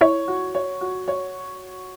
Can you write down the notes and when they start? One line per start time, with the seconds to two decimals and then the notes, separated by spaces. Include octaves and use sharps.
0.01 E4 C#5
0.28 F#4
0.55 C#5
0.81 F#4
1.08 C#5